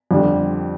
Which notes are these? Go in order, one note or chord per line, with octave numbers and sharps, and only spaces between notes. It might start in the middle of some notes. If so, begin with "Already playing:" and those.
F2 D3 G3 D4